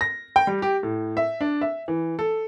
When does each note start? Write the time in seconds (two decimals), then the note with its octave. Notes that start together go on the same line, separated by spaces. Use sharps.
0.01 A#6
0.36 G5
0.47 G3
0.62 G4
0.83 A2
1.17 E5
1.41 D4
1.61 E5
1.88 E3
2.19 A4